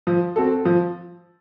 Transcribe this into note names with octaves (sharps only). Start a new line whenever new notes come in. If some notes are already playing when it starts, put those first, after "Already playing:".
F3
C4 F#4 A4
F3